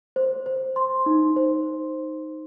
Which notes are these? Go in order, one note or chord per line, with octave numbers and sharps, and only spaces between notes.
C5
C5
C6
D#4
C5